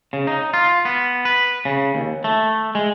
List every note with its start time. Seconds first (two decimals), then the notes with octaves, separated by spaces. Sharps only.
0.13 C#3
0.27 D#4
0.53 F4
0.85 B3
1.25 B4
1.65 C#3
1.95 D#2
2.24 A3
2.75 G#3